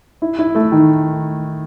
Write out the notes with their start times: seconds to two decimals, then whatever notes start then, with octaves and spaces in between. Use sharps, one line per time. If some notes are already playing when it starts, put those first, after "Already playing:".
0.22 E4
0.39 E4
0.55 A3
0.72 D#3